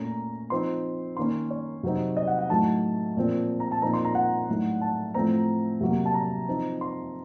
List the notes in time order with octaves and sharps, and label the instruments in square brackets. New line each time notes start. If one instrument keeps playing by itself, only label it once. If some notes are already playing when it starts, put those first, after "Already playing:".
Already playing: [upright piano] A#2 A3 C#4 A#5
F3 C4 D#4 C6
D#3 A#3 C#4 C6
C#5
C3 F#3 C4 D#4
D#5
F#5
F#5
A2 F#3 A3 D#4 A5
A#2 F3 C4
A#5
A5
A#2 F3 C4 D#4 A#5
C6
A#5
F#5
A2 F#3 A3 D#4
A5
A2 F3 A3 C4 A#5
C3 F#3 A#3
A5
A#5
F3 C4 D#4
C6